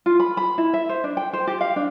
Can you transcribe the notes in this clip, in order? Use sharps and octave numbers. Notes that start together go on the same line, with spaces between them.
F4
B5
B5
E4
E5
C5
D4
G5
C5
G4
F5
D4